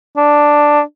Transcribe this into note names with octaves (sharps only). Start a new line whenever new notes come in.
D4